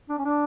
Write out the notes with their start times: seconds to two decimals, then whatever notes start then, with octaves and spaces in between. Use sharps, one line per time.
0.09 D4
0.18 C#4
0.25 D4